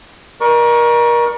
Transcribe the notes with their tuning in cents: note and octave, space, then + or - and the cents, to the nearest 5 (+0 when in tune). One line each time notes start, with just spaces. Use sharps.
A#4 +30 D5 +35 C#6 +0